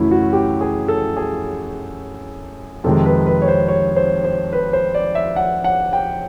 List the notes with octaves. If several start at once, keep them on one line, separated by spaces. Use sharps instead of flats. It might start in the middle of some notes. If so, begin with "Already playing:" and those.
Already playing: F#2 C#3 E3 A3 E4 F#4
F#4
G4
G#4
A4
G#4
F2 C3 D#3 G#3 A4
B4
B4
C#5
C5
C#5
C5
C5
B4
C5
D5
E5
F#5
F#5
G5